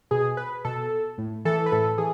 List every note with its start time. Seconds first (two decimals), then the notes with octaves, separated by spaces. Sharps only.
0.11 B2 G#4
0.37 B4
0.65 B2 A4
1.18 A2
1.45 E3 A4
1.66 B4
1.72 A2 A4
1.98 E3 G#4